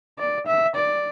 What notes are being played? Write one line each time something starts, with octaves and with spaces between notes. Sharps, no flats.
D5
E5
D5